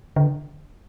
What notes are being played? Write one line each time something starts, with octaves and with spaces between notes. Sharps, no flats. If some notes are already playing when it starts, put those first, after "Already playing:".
D3